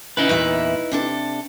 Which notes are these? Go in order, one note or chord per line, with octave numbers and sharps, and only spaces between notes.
C#3 D#4 E4 B4
E2 A#2 E5
C3 D4 A4